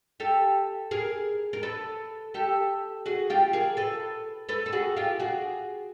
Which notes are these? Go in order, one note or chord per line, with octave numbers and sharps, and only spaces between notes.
G4 A4
G#4 A#4
A#4
A4 B4
G4 A4
F#4 G#4
F4 G4
G#4 A#4
A4 B4
A4 B4
A4
F#4 G#4
F4 G4
F#4 G#4